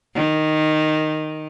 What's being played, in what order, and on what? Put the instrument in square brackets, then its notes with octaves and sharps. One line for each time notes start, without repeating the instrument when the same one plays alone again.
[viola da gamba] D#3